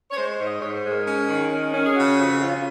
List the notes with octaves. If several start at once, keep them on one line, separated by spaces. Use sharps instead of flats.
C#5
G#3 C5
C5
G#2
D#5
G#2 C#5
C5
G#3
A#4
C#4
D#3
C#4
C#4
G#4
C#3 F#4
F2
C#4 F4